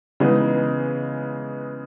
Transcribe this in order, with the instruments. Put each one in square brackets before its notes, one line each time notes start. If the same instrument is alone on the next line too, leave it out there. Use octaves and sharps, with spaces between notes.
[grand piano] C#3 E3 G#3 B3 D#4